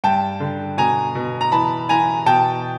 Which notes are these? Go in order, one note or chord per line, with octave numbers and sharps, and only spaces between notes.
G2 G5 A5
D3
B2 G#5 A#5
B2
A#5
E3 A5 B5
E3 G#5 A#5
B2 G5 A5